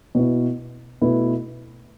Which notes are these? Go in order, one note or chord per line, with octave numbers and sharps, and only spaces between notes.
B2 B3 E4
B2 A3 E4 B4